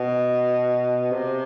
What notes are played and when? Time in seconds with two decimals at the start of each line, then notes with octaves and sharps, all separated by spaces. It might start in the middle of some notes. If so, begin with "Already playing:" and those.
Already playing: B2
1.12 C3